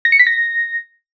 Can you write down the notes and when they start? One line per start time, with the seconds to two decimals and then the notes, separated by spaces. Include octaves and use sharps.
0.05 A#6
0.12 C#7
0.19 B6
0.27 A#6